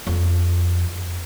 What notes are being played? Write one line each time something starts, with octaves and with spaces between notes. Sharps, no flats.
F2